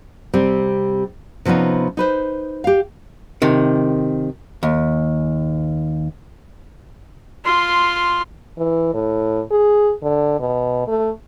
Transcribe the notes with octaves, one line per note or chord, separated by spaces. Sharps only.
C3 G3 C4
C3 F3 B3 C#4 D#4
D#4 B4 C5
G4 F5
C3 D#3
D#2
F4 C6
E3
A2
G#4
D3
B2
A3